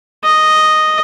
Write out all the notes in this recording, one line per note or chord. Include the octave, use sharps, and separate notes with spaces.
D#5